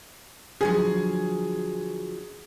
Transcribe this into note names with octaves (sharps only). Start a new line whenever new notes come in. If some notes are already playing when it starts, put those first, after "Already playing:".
D3 F3 F#3 G#4